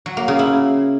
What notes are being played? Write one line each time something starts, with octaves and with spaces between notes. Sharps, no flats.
F#3
A#3
C#3
E4